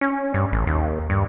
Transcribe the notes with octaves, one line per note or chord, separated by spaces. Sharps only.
C#4
G2
A1
D#2
G2